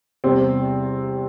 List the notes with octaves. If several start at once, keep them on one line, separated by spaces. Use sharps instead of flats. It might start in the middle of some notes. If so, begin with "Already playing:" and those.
E2 C3 G3 C4